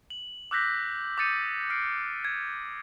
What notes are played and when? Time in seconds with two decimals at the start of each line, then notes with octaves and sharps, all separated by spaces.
0.10 F#7
0.51 D6 E6 F#6 G6 A#6 B6
1.18 D6 D#6 G6 A6 C#7 D#7
1.70 F6 C7 D7
2.25 G#6